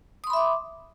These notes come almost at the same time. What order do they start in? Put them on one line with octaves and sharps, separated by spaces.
D#6 C6 B5 E5 D6